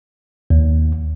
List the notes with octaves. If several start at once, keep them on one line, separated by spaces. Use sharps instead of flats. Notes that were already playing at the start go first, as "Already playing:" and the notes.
D#2